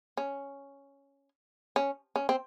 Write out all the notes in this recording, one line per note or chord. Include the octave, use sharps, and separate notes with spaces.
C#4
C#4
C#4
C4